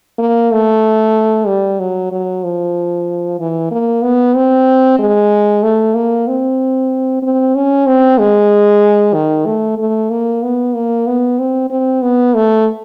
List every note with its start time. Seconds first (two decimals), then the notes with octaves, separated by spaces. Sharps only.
0.19 A#3
0.51 A3
1.47 G3
1.80 F#3
2.12 F#3
2.44 F3
3.40 E3
3.71 A#3
4.03 B3
4.36 C4
4.99 G#3
5.63 A3
5.95 A#3
6.27 C4
7.22 C4
7.55 C#4
7.87 C4
8.19 G#3
9.14 D#3
9.46 A3
9.78 A3
10.10 A#3
10.43 B3
10.74 A#3
11.07 B3
11.39 C4
11.70 C4
12.02 B3
12.34 A3